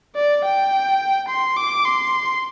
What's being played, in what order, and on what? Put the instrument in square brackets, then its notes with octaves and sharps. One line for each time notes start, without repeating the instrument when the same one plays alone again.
[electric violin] D5
G5
C6
D6
C6